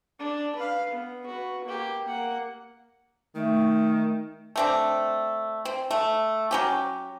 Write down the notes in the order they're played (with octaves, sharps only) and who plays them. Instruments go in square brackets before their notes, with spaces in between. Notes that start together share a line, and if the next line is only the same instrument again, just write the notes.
[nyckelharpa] D4
B4 F5
B3
F#4 B4
A#3 G4
A#3 F#5
[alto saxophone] D#3 [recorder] A3
[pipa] A3 C4 D4
C4
A3
F#3 C#4 G4